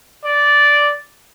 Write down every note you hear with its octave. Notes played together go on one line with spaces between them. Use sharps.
D5